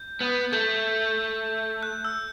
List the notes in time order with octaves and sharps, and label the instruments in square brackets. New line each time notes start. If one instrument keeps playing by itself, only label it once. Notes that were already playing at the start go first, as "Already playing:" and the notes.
Already playing: [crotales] G6
[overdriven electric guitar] B3
[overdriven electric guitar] A3 [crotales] G6
[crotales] F#6
E6